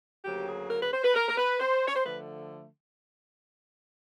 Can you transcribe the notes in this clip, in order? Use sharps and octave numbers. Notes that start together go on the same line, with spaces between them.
D2 C#3 F#3 A#3 G4
G#4
A#4
B4
C5
B4
A#4
A#4
B4
C5
C#5
C5
D3 F3 A3 B4